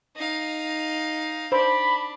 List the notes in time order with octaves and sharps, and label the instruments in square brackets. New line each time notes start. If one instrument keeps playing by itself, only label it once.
[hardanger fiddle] D#4 F5
[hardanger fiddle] D4 [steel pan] C5 [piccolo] B5